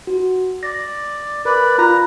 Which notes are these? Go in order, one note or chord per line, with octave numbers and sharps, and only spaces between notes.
F#4
D5 A#6
A#4 B4 D5
F4 A#5 B5 F#6